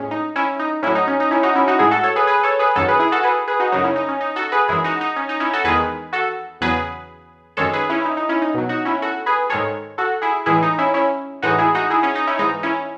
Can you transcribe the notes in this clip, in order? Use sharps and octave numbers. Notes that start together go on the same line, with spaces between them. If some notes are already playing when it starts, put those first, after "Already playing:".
Already playing: A2 G#3 C#4
D#4
C#4 E4
D#4
A2 F#3 C#4 E4
D#4
C#4
D#4
C#4 E4
D#4 F#4
C#4 E4
D#4 F#4
A2 G#3 E4 G#4
F#4 A4
A4 C#5
G#4 B4
G#4 B4
A4 C#5
G#4 B4
F#2 D#3 F#3 A4 C#5
G#4 B4
E4 G#4
F#4 A4
G#4 B4
G#4 B4
D#4 F#4
F#2 C#3 F#3 D#4 F#4
C#4 E4
D#4
C#4
D#4
F#4 A4
G#4 B4
F#2 E3 G#3 E4 G#4
D#4 F#4
D#4
C#4
D#4
C#4 E4
F#4 A4
E2 D#3 G#3 G#4 B4
F#4 A4
E2 C#3 F#3 G#4 B4
F#2 D#3 G#3 A4 C#5
G#4 B4
C#4 E4
E4
D#4
D#4
C#4 E4
D#4
B2 F#3
D#4 F#4
C#4 E4
F#4 A4
G#4 B4
G#2 D#3 G#3 A4 C#5
F#4 A4
E4 G#4
A2 E3 G#3 E4 G#4
D#4
C#4 E4
C#4 E4
A2 E3 G#3 D#4 F#4
E4 G#4
D#4 F#4
E4 G#4
C#4
D#4
C#4 E4
G#2 E3 G#3 D#4
C#4 E4